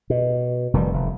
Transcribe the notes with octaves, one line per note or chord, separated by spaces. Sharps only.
B2
F1 D#3 E3 G3
F1